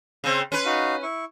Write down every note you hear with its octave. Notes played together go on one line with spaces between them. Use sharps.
C#3 C4
C#4 B4 C6
D#4 F#4 F5
E4 C#6